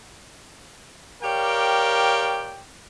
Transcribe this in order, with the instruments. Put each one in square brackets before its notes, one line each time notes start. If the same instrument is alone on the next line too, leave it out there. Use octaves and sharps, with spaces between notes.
[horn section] G4 A#4 C#5 D5 F5 G5